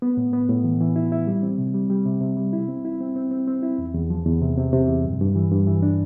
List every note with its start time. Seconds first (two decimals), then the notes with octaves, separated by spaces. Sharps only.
0.02 B3
0.17 A2
0.33 B3
0.49 A2
0.64 E3
0.81 E3
0.96 E4
1.12 E4
1.27 G3
1.43 C4
1.58 C3
1.74 G3
1.90 G3
2.06 C3
2.21 C3
2.37 G3
2.53 E4
2.68 C4
2.85 E4
3.01 C4
3.16 C4
3.31 C4
3.48 C4
3.63 E4
3.78 E2
3.95 E2
4.10 F3
4.26 E2
4.42 C3
4.57 C3
4.73 C3
4.88 E2
5.05 G2
5.20 G2
5.36 E3
5.51 G2
5.67 E3
5.82 D4